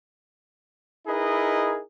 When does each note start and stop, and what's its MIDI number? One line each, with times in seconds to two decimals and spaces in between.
1.07 1.79 63
1.07 1.79 64
1.07 1.79 68
1.07 1.79 70
1.07 1.79 71
1.07 1.79 75